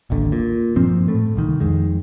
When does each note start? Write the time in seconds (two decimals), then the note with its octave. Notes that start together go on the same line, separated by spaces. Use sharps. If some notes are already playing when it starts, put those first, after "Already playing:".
0.10 D#1 A1 D#2 D3
0.32 A#2
0.76 G2 A#2 F3 C4
1.08 A2 A3
1.36 D1 C2 D#3
1.60 F2 D#3 G#3